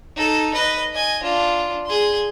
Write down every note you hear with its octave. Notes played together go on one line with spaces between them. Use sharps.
D#4 A4
B4 D#5
D#5 G#5
D4 F4
G#4 C6